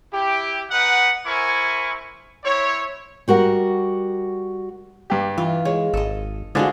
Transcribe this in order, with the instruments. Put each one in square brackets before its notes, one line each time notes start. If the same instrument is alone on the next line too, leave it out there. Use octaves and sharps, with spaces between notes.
[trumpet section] E4 G4
D#4 B4 F#5
E4 A#4 C5 G#5 C#6
C4 E4 C#5
[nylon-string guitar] G3 F#4 A#4 F#5
[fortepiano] G2 G4
[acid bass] E3 [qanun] F4
[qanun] G#3 [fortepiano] C#5
[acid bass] G#1 [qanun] A4 D#5
[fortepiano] D3 D4 G#4 [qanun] F3 F4 F#4 [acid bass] G#3